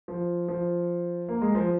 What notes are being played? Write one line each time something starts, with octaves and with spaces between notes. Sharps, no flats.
F3
F3
A#3
G#3
F3